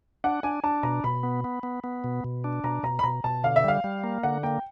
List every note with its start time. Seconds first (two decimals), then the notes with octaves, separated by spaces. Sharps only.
0.24 D4 F#5
0.43 D4 G#5
0.64 D4 A5
0.83 B2 A#5
1.04 B2 B5
1.23 B3
1.44 B3
1.63 B3
1.84 B3
2.04 B2
2.24 B2
2.44 D4
2.64 B2 A#5
2.83 B2 A#5
2.99 B5
3.03 B2 A#5
3.24 B2 A5
3.44 D3 F5
3.56 E5
3.64 G3 F5
3.84 G3
4.04 A#3
4.23 D3 F#5
4.43 A#3 G5